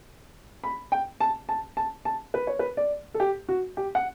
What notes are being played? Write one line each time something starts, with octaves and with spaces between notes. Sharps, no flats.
B5
G5
A5
A5
A5
A5
B4
C#5
B4
D5
A4
G4
F#4
G4
F#5